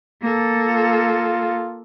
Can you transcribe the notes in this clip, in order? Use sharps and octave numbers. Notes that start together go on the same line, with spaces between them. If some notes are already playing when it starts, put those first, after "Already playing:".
A#3 A4
F4